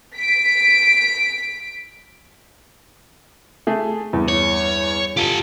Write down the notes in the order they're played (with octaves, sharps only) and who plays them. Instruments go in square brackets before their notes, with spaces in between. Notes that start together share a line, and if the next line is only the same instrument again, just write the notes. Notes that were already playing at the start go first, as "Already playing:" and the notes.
[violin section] B6 D7
[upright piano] A3 G#4
E2 G2
[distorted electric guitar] C#5
[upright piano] F4 D#7 G7 [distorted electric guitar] G4 A4